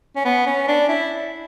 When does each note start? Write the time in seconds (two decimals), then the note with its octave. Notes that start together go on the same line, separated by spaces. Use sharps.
0.16 C#4
0.25 B3
0.47 C#4
0.68 D4
0.88 E4